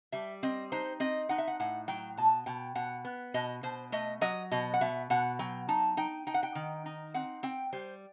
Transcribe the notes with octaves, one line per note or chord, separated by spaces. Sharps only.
G3 E5
C4 D#5
D#4 C5
C4 D#5
D#4 F#5
E5
F#5
A2 F#5
F#3 G5
B2 A5
B2 G5
B2 F#5
B3
B2 D#5
B2 C5
A3 D#5
F#3 D#5
B2 D#5
F#5
B2 E5
B2 F#5
F#3 G5
D#4 A5
D#4 G5
D#4 G5
F#5
G5
D#3
D#4
C4 F#5
C4 G5
G3 C5